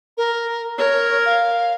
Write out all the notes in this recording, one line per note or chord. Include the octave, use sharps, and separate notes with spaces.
A#4
A#4 C#5
F5